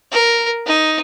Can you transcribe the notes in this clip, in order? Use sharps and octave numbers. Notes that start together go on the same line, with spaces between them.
A#4
D#4